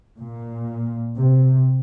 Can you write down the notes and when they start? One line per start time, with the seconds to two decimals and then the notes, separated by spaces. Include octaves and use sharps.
0.18 A#2
1.18 C3